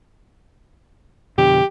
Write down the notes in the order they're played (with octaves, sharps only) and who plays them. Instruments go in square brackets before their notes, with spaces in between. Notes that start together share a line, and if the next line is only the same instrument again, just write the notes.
[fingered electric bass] F2 B2 D3 [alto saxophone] G4